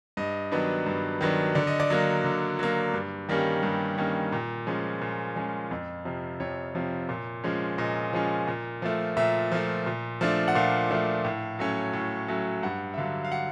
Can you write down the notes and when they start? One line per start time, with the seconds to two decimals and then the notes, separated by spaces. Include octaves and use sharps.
0.17 G2 D#5
0.52 D#3 F#3 B3 D4
0.86 G2
1.21 D#3 F#3 B3 D4
1.55 D3 D5
1.67 D#5
1.80 D5
1.90 F#3 A#3
2.24 D3
2.59 F#3 A#3
2.94 G2
3.29 D#3 G3 A#3 C#4
3.63 G2
3.98 D#3 G3 A#3 C#4
4.32 A#2
4.67 F3 G#3 C#4
5.02 A#2
5.36 F3 G#3 C#4
5.71 F2
6.05 C3 F3
6.40 F2 C#5
6.75 C3 F3
7.09 A#2
7.44 F3 G#3 C#4
7.78 A#2 D#5
8.13 F3 G#3 C#4
8.48 A#2
8.82 F3 A3
9.17 A#2 E5
9.52 F3 A3
9.86 A#2
10.21 F3 A3 D4
10.48 F#5
10.55 A#2 F5
10.90 F3 A3 D4
11.25 A2
11.59 F#3 A3 C#4
11.93 A2
12.28 F#3 A3 C#4
12.63 G2 F#5
12.94 E5
12.98 D3 F#3 F5
13.24 F5
13.32 F#5